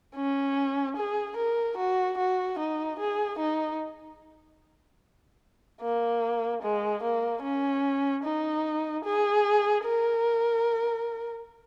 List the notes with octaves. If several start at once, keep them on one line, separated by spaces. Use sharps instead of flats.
C#4
G#4
A#4
F#4
F#4
D#4
G#4
D#4
A#3
G#3
A#3
C#4
D#4
G#4
A#4